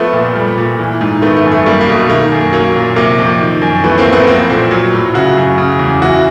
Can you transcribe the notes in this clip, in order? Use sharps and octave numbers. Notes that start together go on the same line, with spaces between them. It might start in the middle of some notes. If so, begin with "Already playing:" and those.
Already playing: F3 A3 B3
A#2
G3
A#2
E3
G#2
D#3 A3 B3
A3
F#2
A3
G3 A#3
A#3
B2
A3
D#3 A#3
F#2
F#3 A#3
A#2
C3 A#3
F2
D#3
F#2
E3 A3 B3
A#3 C4
A2
A3 B3
F3 A#3 C4
A#2
F#3
A2
C#3 E4 F#4
F#2
C#3
E2
E3 E4 F#4